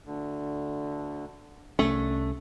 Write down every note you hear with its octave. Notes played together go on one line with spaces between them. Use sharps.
D2 D3
C2 A3 C#4 D4